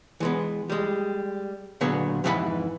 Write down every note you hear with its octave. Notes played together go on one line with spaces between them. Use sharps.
E3 G#3 B3
G3 G#3
A#2 D3 F#3 B3 G#4
F2 G#2 E3 F4 F#5 B5